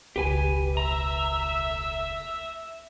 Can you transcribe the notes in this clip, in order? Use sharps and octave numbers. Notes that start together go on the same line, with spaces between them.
E1 C#2 G4 B4 G#5
E5 A#5